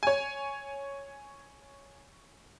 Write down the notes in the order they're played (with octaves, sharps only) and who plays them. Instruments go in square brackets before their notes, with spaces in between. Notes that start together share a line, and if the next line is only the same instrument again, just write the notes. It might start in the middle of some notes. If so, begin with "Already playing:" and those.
[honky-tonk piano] C#5 G#5